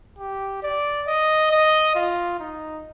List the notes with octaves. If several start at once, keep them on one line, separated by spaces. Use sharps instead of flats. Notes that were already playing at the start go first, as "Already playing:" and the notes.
G4
D5
D#5
D#5
F4
D#4